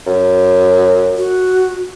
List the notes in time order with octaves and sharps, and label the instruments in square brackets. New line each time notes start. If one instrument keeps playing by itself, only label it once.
[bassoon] F#2
[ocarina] F#4